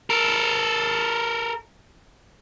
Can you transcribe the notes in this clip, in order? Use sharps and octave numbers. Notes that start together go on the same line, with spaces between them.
A4 A#4